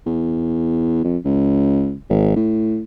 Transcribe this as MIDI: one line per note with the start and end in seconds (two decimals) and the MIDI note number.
0.07 1.03 40
1.04 1.18 41
1.25 1.95 37
2.10 2.35 32
2.36 2.82 45